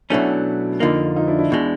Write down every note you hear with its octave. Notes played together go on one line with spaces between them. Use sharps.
B2 F#3 A3 C#4 D4 E4
F2 D3 F3 A#3 D#4 F4
D#4 F4
D4 E4
D4 E4
E2 B2 G#3